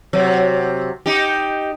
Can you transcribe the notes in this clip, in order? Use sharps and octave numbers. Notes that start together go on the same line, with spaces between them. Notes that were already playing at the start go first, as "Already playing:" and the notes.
C3 F#3
D#4 G4